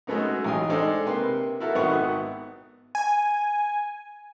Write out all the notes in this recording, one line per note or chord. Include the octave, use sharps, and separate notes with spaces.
F#3 G#3 A3 B3 C#4 D#4
A1 D#4 G5 G#5 D#6
G#3 D4 D#4 A4 C5 D5
C3 A#3 B4 G5 C6
E4 F#4 A4 A#4 E5
G#1 D#3 B3 E5 F#5 C#6
G#5